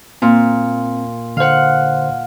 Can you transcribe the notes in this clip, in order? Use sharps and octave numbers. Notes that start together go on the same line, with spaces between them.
A#2 C4
D3 C5 F5 F#5